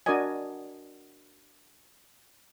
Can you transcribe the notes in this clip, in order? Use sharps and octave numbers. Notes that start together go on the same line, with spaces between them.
D4 F#4 A#4 D5 D#5 G#5